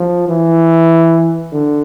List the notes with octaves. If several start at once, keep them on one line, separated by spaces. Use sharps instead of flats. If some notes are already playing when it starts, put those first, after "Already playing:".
Already playing: F3
E3
D3